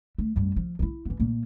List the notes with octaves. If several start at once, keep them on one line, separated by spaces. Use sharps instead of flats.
A3
F#2 G3
F3
D#4 E4
E3 B3
A#2 A#3